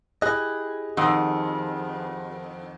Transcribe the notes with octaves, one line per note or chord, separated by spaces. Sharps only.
E4 G4 G#4 D#5 F#6
F2 D#3 F#5 D#6